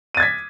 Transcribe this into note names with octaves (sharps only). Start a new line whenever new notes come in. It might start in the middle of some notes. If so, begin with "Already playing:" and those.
G#6 A6 B6 D#7